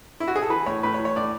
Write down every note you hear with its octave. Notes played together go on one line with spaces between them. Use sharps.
E4
F#4
G#4
A4
E3 B4
A2 C#5
A2 B4
C#5
E3
C#5
A2 D5